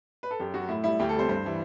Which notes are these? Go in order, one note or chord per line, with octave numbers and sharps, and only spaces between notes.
B4
A4
F#2 G4
F#3 F#4
A2 E4
G3 E4
D2 G4
A4
C3 G3 C5
G2 C5
E3 G3